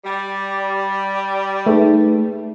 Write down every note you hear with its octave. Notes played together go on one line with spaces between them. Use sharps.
G3
A3 D#4 G#4 B4